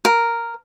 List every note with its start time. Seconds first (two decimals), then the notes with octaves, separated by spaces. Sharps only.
0.05 A#4